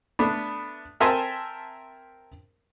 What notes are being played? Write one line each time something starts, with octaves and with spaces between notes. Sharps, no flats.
A3 B3 D4
C4 A#4 E5 G#5 A5 C6